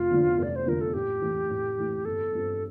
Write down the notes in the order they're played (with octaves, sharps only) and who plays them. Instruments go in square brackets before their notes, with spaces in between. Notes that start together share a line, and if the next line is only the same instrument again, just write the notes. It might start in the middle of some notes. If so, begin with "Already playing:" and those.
Already playing: [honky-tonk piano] F1 [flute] F4
[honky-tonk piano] E2 D3 F3
F1
[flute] D5
C5
[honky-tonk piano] E2 D3 F3 [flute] A#4
[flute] A4
[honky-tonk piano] A2 [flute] G4
[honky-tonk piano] E3 A3 E4
A2
E3 A3 E4
[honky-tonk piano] G1 [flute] A4
[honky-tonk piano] G2 F3 C4